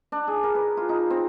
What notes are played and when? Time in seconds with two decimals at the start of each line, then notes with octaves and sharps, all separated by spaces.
0.12 D4
0.28 G#4
0.43 A#4
0.55 B4
0.77 F4
0.89 D#4
1.10 C4